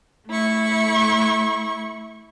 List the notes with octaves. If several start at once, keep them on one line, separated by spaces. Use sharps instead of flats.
A3 E4 C#6